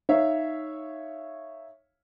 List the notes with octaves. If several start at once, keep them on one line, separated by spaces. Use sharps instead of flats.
D#4 C#5 E5 F5